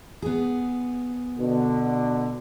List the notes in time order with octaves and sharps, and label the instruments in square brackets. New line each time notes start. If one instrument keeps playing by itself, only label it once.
[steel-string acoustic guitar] B3 G#4
[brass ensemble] B2 D3